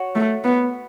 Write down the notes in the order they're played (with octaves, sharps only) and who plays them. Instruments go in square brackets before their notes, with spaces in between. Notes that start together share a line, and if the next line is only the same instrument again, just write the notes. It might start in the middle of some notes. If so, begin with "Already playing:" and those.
Already playing: [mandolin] F#4 C#5
[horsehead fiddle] A3
B3